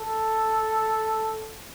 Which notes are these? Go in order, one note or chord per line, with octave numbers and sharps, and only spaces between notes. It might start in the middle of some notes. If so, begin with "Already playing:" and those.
Already playing: A4